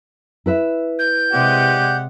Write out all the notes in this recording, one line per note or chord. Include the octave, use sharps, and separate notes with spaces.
E4 B4 E5
G6
C3 G#3 G4 D5 F#5